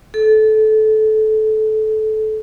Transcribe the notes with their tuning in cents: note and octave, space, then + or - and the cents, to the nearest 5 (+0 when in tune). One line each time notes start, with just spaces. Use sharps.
A4 -20